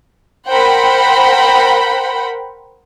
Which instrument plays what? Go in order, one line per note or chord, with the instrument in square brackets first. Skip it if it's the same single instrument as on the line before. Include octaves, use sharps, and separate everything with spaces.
[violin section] A#4 C5 F#5 G5 B5